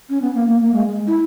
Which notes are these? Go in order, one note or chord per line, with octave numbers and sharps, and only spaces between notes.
C#4
B3
A#3
A#3
A#3
G#3
G#3
E4